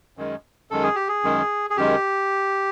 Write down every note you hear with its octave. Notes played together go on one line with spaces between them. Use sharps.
F#2 D#3 G#3
F#2 D#3 G#3 A4
G#4
G4
G#4
F#2 D#3 G#3
G#4
F#2 D#3 G#3 G4